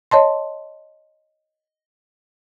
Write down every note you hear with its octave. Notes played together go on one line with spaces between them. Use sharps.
C#5 D#5 A5 C6